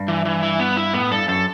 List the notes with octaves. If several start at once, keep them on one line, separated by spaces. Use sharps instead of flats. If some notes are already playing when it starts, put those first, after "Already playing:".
Already playing: G2
E3
E3
E4
B3
E4
A2 B3
G2 A4
F#2 A4